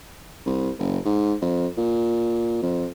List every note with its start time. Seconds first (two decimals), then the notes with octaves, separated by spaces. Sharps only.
0.46 C2
0.79 F#1
1.05 G#2
1.42 F2
1.77 A#2
2.62 F2